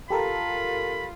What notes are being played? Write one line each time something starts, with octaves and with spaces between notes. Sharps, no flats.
F4 G4 A4 A#4 B5